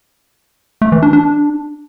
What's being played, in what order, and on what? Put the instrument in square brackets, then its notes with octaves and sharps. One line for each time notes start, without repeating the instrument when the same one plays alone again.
[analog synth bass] A3
E3
D4
D4